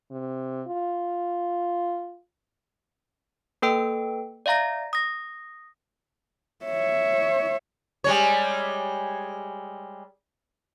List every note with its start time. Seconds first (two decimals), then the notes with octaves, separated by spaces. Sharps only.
0.11 C3
0.68 F4
3.62 A#3 A4 B4 G5 E6 D7
4.46 D5 E5 F5 A#5 A#6
4.93 D#6 A#6
6.65 C#5 E5
8.04 G3 G#3 C#5